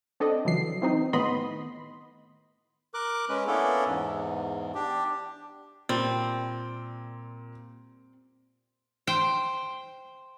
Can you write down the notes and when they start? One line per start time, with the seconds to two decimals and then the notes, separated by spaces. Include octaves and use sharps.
0.20 C4 D4 A4 D5 D#5
0.45 C#3 E3 F#3 C7
0.82 E3 C4 D#4
1.13 A2 D#3 B3 D#5 B5 C6
2.94 A#4 D6 F#6
3.29 G#3 C#4 B4
3.47 A#3 B3 C#4 D4 E4 A4
3.86 E2 G#2
4.75 D4 G4
5.89 A#2 G3 C4
9.07 C5 G5